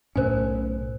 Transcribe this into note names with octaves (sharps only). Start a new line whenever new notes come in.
B1 A2 C#4 A#4 C5 G#5